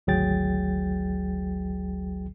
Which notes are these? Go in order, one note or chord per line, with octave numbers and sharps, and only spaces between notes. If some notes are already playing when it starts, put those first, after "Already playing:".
G#1 D2 F#3 G#4 G5 A6